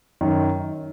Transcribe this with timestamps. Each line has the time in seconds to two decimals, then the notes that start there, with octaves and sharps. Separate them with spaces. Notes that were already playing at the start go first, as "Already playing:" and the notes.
0.21 F#2 D#3